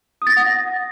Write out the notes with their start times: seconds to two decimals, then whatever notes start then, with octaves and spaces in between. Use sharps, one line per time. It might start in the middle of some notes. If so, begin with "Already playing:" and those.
0.22 D#6
0.27 A6
0.32 A#6
0.37 F#5